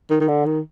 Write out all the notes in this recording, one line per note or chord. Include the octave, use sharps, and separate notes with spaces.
D#3
D#3
D3
D#3